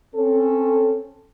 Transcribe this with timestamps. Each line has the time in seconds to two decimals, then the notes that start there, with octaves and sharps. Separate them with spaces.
0.15 C4 C#4 A4